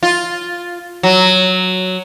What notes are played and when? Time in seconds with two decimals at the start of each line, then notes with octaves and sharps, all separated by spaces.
0.03 F4
1.03 F#3